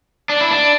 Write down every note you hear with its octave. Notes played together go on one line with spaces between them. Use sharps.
D4
E4
D4